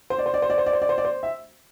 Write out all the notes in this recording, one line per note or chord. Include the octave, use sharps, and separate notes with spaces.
C5
D5
C5
D5
C5
D5
C5
D5
C5
D5
C5
D5
C5
E5